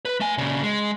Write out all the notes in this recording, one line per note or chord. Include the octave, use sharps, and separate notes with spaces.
B4
A3 G#5
A#2 C#3
G#3